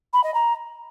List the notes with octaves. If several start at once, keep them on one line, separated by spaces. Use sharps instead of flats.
B5
D#5
A#5